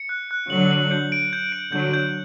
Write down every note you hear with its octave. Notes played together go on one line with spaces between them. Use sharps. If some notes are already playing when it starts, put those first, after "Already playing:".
Already playing: C#7
F#6
F#6
D3 F#3 F#7
F#7
G6
D7
G6
D7
D3 F#3 G6
G6